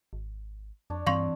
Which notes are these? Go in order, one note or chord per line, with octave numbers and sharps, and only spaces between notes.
G#1
F2 D4 C#5
G2 E3 C4 F5 C6 C#6